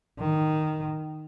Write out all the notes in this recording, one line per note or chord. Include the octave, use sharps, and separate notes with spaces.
D#3